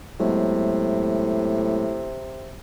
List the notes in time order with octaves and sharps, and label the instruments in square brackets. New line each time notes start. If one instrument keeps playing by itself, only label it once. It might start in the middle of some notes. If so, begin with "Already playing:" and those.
[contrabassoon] A2 [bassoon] C3 [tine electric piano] F#3 G#3 B3